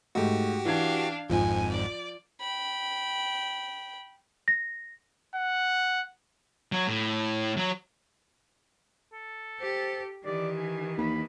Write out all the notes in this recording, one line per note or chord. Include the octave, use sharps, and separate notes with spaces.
G#2 A3 F#4 G4
E3 D4 F5 G#6
G#1 F2 G#2 F3 G#5
D5
G5 B5
A#6
F#5
F#3
A2
F#3
A4
G4 C5
D#3 E3 G4 D5
G#5
D#2 B5